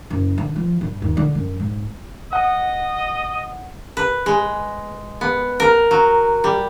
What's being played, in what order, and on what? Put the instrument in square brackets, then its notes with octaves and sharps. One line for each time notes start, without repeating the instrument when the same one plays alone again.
[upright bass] F#1
D3
F3
G2
D#2
D3
F#2
G#2
[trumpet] D#5 [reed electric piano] F#5
[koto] B4
G#3
B3
A#4
F#3
G3